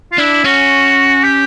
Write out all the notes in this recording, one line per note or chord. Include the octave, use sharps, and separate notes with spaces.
F4
D4 E4
C#4 F#4
G4